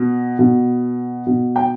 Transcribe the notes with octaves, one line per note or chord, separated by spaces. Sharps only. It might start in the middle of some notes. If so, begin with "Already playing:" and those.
Already playing: B2
B2
B2
G5